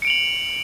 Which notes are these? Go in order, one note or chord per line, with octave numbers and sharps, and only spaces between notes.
C#7 D7 F7 F#7